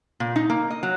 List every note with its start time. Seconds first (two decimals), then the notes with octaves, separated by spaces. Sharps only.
0.20 A#2
0.36 D#4
0.50 A#3
0.71 D#5
0.83 F#3